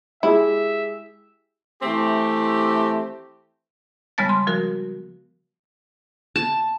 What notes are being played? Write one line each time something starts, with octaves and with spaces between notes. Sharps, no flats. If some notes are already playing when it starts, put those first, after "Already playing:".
G#3 E4 G4 G#4 E5
E3 A3 C4 G4
C#3 G3 G#3 B3 A5 A6
C6
F3 F#4 A#4
A5